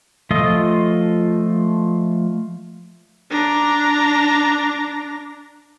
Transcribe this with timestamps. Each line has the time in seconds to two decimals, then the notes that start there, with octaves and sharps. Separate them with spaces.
0.31 F3 A3 F4 D#5
3.31 D4 A#5